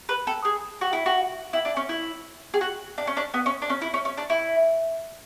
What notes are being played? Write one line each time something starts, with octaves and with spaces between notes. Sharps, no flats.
B4
A4
G#4
F#4
E4
F#4
E4
D4
C#4
E4
G#4
F#4
D4
C#4
D4
B3
C#4
D4
C#4
E4
C#4
C#4
D4
E4